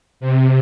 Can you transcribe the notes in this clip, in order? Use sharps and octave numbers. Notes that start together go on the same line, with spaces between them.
C3